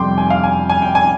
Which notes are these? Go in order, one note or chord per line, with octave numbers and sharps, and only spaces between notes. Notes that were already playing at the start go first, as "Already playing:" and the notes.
Already playing: F2 C3 G3 G5 C6 D6
G#5
F5
G#5
G#5
G5
G#5